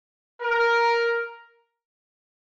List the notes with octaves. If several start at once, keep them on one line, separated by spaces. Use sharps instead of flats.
A#4